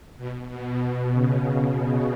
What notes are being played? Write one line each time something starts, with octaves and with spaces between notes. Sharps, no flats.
B2
B2
B2
C#3
B2